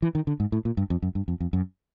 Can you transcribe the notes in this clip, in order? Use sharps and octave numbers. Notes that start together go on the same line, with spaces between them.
E3
D#3
D3
G#2
A2
A#2
G2
F2
F#2
G2
F2
F2
F#2